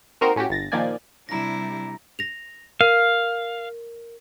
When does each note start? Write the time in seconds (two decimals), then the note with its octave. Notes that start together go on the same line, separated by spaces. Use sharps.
0.21 A#3 C4 D#4 F#4 A#4 C5
0.36 A2 C#4 F#4 G4
0.50 G1 A6 A#6
0.72 A#2 D#3 F3 A#3 D5 G#5
1.29 C3 G3 D4 E4 A#5 A#6
2.19 A#6 F7
2.81 A#4 F5